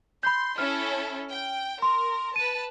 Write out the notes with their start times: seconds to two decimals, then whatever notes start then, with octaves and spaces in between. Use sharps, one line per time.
0.23 B5 C6 G6
0.58 C#4 E4 A4 F6
1.31 G5
1.82 A#4 C6
2.36 B4 A5 D#7